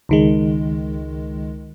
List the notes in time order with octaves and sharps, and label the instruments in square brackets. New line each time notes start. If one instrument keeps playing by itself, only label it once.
[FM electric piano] C#2 D#3 G#3